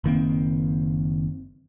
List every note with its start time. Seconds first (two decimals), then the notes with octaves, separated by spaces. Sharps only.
0.04 F#1 D#3 A#3 C4